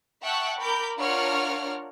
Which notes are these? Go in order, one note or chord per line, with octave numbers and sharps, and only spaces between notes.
E5 F#5 G5 A5 C#6 F#6
A#4 B5 D6 G6
D4 F4 A#4 C#5 F#5 F6